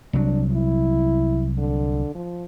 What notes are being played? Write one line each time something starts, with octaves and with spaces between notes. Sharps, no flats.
C2 F#3 D4
E4
D3
F3